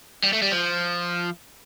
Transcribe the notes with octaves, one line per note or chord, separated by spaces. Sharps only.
G3
A3
G3
F3